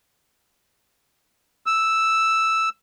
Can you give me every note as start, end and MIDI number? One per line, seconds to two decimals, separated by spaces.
1.66 2.69 88